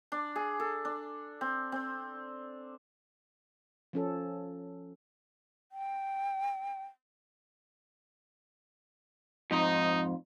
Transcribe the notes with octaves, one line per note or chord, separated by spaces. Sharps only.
D4
G#4
A4
D4
C4
C4
F3 C#4 A4
G5
F2 G#2 D#4